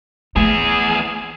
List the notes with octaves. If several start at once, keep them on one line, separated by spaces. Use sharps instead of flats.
E2 A3 G#4